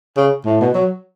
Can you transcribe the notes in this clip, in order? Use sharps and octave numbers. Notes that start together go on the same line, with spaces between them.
C#3
A2
B2
F#3